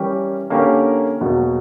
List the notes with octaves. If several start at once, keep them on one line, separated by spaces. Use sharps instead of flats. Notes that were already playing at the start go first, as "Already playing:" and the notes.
Already playing: E3 G3 C#4 G4 A#4
D3 A#3 C#4 G4 A#4
E2 B2 F#3 A#3